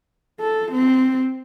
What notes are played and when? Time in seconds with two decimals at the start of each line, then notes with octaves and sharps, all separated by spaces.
0.41 A4
0.72 C4